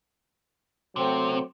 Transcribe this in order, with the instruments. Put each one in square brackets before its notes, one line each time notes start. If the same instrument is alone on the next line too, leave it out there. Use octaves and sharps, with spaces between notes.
[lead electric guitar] C3 [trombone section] F#3 A3 C4